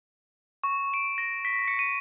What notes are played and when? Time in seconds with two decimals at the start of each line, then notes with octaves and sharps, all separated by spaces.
0.64 C#6
0.94 D7
1.18 A#6
1.45 B6
1.68 C#7
1.79 D#7